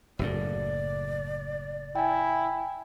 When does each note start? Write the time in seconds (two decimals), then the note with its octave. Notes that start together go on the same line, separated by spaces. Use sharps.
0.19 F#1 F#2 A2 D5
1.96 E4 G5 G#5